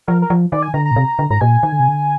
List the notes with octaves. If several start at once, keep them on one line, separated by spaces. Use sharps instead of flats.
F3 A#4
A#4
F3
D#3 D5
G#5
D3 A#5
A#5
A#2
C3
D3
G#2 A#5
A#2 G#5
D#3
D3
C3
D3